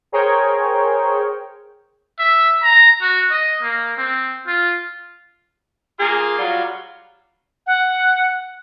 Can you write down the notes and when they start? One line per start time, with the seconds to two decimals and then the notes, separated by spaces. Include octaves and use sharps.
0.12 G#4 A#4 C5 C#5 G5
2.19 E5
2.63 A#5
3.01 F#4
3.31 D#5
3.62 A#3
3.98 C4
4.47 F4
5.99 A#3 F4 G#4
6.38 F#3 G3 F4 D5
7.67 F#5